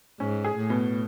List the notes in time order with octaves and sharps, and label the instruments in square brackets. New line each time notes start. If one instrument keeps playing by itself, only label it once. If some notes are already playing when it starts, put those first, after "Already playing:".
[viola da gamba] G#2 [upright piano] C#4
[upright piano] G#4
[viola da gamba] A2
[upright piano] B2